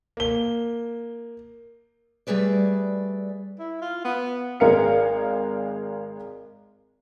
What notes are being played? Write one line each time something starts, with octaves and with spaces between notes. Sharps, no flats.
A#3 G7
G3 A3 G#4 B4 D5
E4
F4
B3
G#1 G#3 A#4 F5 C#7